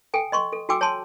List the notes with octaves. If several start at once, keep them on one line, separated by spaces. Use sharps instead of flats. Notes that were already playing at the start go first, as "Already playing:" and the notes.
A4 G5 G#5
D#5 C6 C#6
A4
F#4 A4 G5 G#5 D6 E6
C#5 G#5 A5 C6